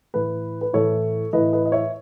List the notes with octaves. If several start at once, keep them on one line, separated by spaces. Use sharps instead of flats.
A2 E3 B4
B4
A2 E3 A4 C#5
A2 E3 B4 D#5
B4 D#5
D#5
C#5 E5